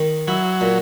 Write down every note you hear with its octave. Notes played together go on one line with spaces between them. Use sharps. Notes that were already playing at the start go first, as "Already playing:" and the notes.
Already playing: D#3
F#3 E4
A#2